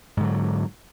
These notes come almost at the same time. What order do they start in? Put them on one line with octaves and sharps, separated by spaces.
G#2 D3 F#3